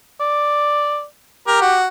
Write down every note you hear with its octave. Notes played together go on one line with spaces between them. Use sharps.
D5
G4 A#4
F#4